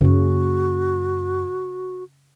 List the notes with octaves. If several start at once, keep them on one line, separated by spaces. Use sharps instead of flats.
F#2 C#3 A#3 F#4